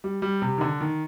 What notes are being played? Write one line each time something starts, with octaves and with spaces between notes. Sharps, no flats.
G3
G3
C3
D#3
D3
D#3